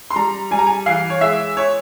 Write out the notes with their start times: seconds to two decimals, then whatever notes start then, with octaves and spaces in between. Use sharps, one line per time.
0.10 C6
0.16 G3 A#5
0.51 G3 G#5
0.59 A#5
0.67 G#5
0.86 E3 F5
1.10 C#5
1.21 G#3 E5
1.57 C#5